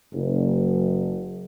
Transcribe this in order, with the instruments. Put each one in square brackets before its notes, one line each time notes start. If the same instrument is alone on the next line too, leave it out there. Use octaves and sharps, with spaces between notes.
[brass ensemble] F#1